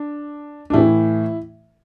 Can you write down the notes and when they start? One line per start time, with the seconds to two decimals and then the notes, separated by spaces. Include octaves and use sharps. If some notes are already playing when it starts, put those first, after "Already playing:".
Already playing: D4
0.70 D4
0.73 A2 E3 E4